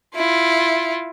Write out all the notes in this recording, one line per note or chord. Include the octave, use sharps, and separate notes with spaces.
E4 F4